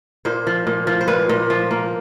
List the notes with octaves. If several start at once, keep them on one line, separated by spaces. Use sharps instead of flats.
A#2 C5
F3
A#2
F3
C5
A#2 B4
A#2
F3
A#3